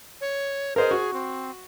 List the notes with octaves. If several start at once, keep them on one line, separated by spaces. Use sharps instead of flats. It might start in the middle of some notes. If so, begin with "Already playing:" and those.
C#5
G#4 A#4 C5 D#5
F#4
C4